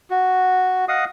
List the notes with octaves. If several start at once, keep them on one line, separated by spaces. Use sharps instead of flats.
F#4
D#5 F5 F#5 D#6